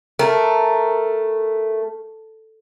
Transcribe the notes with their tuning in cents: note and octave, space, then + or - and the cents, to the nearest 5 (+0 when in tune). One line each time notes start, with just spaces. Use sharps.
A3 +0 A#4 +0